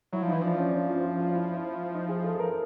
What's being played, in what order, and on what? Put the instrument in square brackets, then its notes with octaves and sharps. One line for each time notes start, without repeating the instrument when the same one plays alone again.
[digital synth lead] F#3 [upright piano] E4
[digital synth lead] F3
[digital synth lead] E3 [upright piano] D#4
[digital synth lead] F3 [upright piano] D4
[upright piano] C#4
C#4
F4
F4
F4
E4
E4
D#4
G#4
A4
A#4